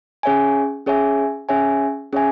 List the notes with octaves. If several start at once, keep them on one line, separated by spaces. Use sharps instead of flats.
C#4 G#4 C#5 E5 G#5
C#4 G#4 C#5 E5 G#5
C#4 G#4 C#5 E5 G#5
C#4 G#4 C#5 E5 G#5